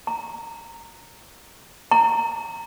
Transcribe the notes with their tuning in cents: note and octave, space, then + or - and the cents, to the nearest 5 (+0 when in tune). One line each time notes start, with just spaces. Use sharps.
A#5 -15
A#5 -20